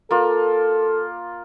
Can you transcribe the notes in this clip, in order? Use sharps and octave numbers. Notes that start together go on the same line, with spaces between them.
A#3 F4 A4